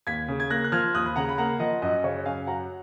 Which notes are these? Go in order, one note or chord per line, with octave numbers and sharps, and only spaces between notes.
D#2 G#6 B6
C#3
G#6
A#3 F#6 A#6
F#6
F3 F6 G#6
D#2 D#6 F#6
B5
C#3 F#5 A#5
B5
A#3 F#5 A#5
F3 D#5 F#5
F#2 D#5
C#3 C#5 F5
F#2 F5 G#5
F#3 F#5 A#5